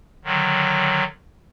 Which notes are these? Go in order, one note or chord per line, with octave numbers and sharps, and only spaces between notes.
D3 D#3 F#3